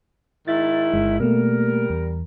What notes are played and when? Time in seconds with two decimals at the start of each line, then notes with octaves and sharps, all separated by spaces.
0.48 G#2 D#3 E4 A6
0.93 G1 G#3
1.20 B2 G3 A3 A#3 A#4
1.90 E2